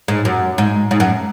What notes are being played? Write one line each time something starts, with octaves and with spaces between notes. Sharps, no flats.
G#2
F#2
G#2
G#2
F#2